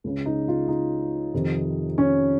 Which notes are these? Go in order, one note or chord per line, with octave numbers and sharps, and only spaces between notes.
C#2 C#3
D#4
F4
D#4
F2 C3 D#3
C#4